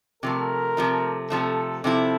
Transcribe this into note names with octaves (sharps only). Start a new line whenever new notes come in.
C3 F3 A3 A#4
C3 F3 A3
C3 F3 A3 A4
C3 F3 C4 E4 A4